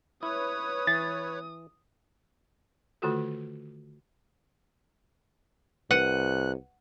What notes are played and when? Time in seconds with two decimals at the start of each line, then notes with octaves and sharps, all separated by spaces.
0.23 E4 B4 C#5 D#6
0.87 E3 A6
3.02 D3 D#3 A3 F4 F#4 A4
5.91 C2 B4 F#5 F#6 C#7 D#7